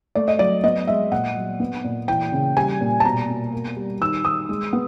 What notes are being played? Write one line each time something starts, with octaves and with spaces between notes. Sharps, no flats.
A3 D5
D#5
F#3 D5
B3 D#5
G#3 E5
A#2 F#5
F#3
B3
A#2
E3 G5
C#3
G3 G#5
A#2
A5
B2 A#5
B2
A#3
G3
D#3 E6
D#3 D#6
G#3
B3